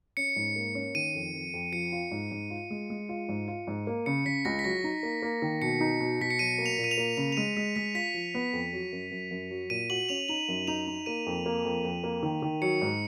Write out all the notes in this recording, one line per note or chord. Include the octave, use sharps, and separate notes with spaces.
C#4 C#7
G#2
A#3
C#4
D#3 D#7
F2
F2
F2
F3 C#7
F4
G#2
G#2
F4
G#3
G#3
F4
G#2
F4
G#2
A#3
C#3 C#7
C#3 B6
C#2 A#6
B6
F#3 A#6
D#4
A#3
A#3
D#3
B2 C#7
D#4
B2
B2 B6
C#7
F#3 D#7
A#3
F7
A#2
D#7
F7
A#3
C#3 F7
F7
G#3 D#7
G#3 B6
G#3 B6
F4 B6
F3
B3
F2
F#3
F#2
F#2
F#2
F#3
A#2 D#7
F#4 F#7
C#4 F7
D#4 F#7
F#2
D#4 F7
D#4
A#3 D#7
F2
A#3
F2
F2
A#3
D#3
D#3
F#3 C#7
G#2